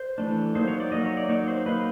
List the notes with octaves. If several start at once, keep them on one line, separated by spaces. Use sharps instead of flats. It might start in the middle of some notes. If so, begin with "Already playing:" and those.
Already playing: C5
E3 A3 D4
F#3 A#3 D#4 C5
C#5
D5
F#3 A#3 D#4 D#5
C#5
D5
F#3 A#3 D#4 C#5
C5
F#3 A#3 D#4 B4